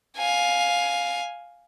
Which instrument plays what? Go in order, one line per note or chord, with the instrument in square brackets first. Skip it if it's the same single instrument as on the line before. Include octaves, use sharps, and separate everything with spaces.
[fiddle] F5 G#5